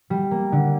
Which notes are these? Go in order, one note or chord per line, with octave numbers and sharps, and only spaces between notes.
G3
A#3
D3